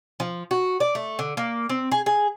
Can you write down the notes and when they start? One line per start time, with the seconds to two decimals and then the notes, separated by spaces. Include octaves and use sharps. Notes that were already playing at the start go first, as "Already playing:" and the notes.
0.20 F3
0.51 F#4
0.80 D5
0.95 A3
1.19 D3
1.37 A#3
1.69 C4
1.92 G#4
2.06 G#4